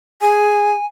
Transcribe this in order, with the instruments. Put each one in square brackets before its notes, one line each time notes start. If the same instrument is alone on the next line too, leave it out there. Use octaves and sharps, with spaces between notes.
[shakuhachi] G#4 [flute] G#5